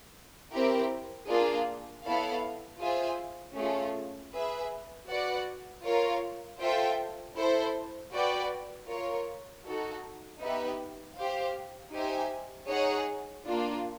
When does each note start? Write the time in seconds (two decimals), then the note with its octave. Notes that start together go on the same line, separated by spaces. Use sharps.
0.52 C4 E4 G4 A#4
1.28 A#3 D4 F4 G#4
2.05 B3 E4 A4 C#5 F5
2.80 F4 G#4 C5 E5 G#5
3.57 A3 C#4 F4 G#4
4.33 G#4 B4 E5
5.09 F#4 B4 D5 F#5
5.84 F4 A#4 C#5 F5
6.60 F4 A4 C5 E5 G5
7.37 E4 A4 C5
8.14 F#4 B4 D5 G5
8.89 F4 A#4 C#5
9.65 D#4 F#4 A4
10.41 B3 D#4 G4 B4 E5
11.18 G4 C5 F5
11.93 D#4 G4 C5 E5 G#5
12.69 D#4 G#4 C#5 F#5
13.45 A#3 D4 F4